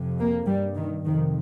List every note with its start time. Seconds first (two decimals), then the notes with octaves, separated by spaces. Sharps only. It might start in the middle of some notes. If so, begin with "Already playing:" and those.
Already playing: F2 C3
0.18 A#3
0.46 G2 G3
0.75 D#3
1.04 F2 C3 D#3